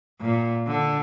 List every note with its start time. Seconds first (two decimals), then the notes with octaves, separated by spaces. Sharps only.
0.21 A#2
0.67 D3